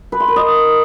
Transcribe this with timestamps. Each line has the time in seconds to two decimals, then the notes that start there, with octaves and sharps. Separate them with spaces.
0.12 B4
0.20 C6
0.28 A#4
0.36 D#5